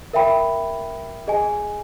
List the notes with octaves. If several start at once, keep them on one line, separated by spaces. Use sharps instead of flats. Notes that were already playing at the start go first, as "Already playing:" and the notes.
A#4 E5 G5 B5
G#4 D#5 G#5